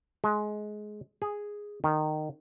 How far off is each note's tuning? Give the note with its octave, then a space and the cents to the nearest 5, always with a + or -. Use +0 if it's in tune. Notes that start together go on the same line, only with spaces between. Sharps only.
G#3 +20
G#4 -5
D#3 -20